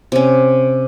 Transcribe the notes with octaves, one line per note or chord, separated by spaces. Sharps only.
C3 C#4